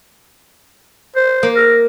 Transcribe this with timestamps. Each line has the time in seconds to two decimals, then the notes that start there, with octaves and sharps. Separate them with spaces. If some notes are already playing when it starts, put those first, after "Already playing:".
1.16 C5
1.43 A#3
1.56 A#4